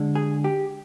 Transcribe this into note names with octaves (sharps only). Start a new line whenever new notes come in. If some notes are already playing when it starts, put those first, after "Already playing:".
Already playing: D3 G#3
G#4
G4